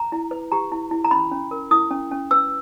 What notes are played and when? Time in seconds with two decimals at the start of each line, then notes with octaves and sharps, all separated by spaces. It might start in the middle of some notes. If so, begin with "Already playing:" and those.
Already playing: A#5
0.12 E4
0.31 B4
0.52 G4 A#5
0.72 E4
0.91 E4
1.05 A#5
1.11 C#4 B5
1.31 C#4
1.51 A#4
1.71 E4 D#6
1.91 C#4
2.12 C#4
2.31 B4 E6